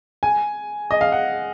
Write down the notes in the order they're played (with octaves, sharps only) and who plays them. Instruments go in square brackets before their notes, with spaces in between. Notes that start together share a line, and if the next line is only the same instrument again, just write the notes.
[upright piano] G#5
D#5
F5
F#5